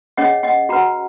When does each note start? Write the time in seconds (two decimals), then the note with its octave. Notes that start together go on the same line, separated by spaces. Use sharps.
0.17 C#4 G#4 C#5 D#5 F#5
0.43 D#5 F#5
0.69 F#4 B4 F#5 A#5